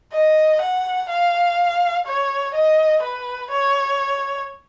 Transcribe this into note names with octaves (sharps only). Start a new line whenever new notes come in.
D#5
F#5
F5
C#5
D#5
B4
C#5